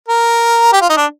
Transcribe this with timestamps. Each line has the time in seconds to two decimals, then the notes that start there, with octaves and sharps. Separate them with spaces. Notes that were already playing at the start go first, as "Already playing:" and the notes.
0.08 A#4
0.73 G4
0.81 F4
0.89 D#4
0.97 D4